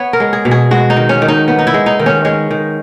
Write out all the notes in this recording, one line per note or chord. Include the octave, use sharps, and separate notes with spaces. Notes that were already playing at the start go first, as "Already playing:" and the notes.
Already playing: B3 C#5
A#4
G#3
G#4
B2
G#4
G#3 F#4
D#4
D#3
C#4
D#3
D#4
B3
D#4
E4
G#3
D#4
D#3
C#4
G#3 C#4
D#3